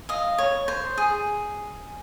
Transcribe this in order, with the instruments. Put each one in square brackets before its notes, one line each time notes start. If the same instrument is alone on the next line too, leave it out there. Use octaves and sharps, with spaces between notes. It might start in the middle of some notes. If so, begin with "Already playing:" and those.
[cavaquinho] D#5 F5
C#5
C5
G#4